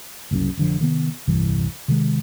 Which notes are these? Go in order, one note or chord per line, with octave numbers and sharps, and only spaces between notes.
F#1 C2 F#2 C#4
F1 D3 F3
C3 D#3 G#3 B3
D#1 C2 G2 E3
C3 D#3 G#3